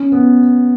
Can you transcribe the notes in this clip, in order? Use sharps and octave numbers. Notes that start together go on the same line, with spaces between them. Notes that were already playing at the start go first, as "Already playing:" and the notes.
Already playing: C#4
B3